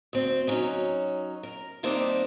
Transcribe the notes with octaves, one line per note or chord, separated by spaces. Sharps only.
D2 C4
F#3 C#4 D#4
A#4
D#3 G3 A#3 C4 D4 D#4